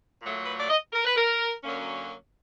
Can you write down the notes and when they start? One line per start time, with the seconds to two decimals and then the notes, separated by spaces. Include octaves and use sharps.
0.22 A#2 F#3 A3
0.46 B4
0.58 D5
0.69 D#5
0.93 A#4
1.05 B4
1.16 A#4
1.64 F#2 D3 F#3 A#3 C#4